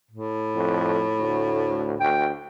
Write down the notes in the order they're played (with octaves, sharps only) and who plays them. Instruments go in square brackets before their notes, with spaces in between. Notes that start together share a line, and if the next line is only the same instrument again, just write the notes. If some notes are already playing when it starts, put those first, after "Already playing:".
[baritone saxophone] A2
[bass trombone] F2
D2
[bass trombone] D2 [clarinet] G5